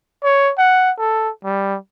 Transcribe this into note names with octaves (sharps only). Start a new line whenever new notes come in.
C#5
F#5
A4
G3